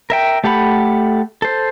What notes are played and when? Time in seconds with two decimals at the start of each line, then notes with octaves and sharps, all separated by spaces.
0.10 A#4 E5 G5
0.44 A3 G4 A4 F#5 B5
1.42 A4 C5